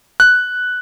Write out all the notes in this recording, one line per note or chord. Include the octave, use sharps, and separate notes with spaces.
F#6